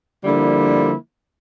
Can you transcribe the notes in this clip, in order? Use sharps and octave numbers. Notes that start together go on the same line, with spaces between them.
D3 F3 G3 A#3 E4